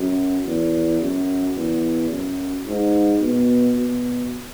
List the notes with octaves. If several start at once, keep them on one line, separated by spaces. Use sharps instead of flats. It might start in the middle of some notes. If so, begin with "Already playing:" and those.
Already playing: F#2
E2
F#2
E2
F#2
G#2
B2
B2